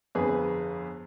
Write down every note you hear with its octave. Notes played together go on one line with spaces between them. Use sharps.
G1 F2 G#4 B4